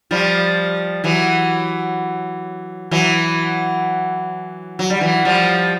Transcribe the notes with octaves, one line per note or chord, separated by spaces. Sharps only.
F3 G3
E3 F#3
E3 F#3
F#3
G3
E3 F#3
F3 G3